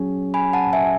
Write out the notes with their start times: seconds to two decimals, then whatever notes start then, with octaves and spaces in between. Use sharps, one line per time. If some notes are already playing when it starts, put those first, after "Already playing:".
Already playing: F#3 C#4 G#4
0.34 G#5 B5
0.53 F#5 A5
0.73 E5 G#5